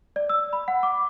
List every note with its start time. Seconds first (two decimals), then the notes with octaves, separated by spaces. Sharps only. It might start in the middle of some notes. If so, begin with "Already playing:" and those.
0.16 D5
0.29 E6
0.53 B5
0.68 F#5
0.83 D6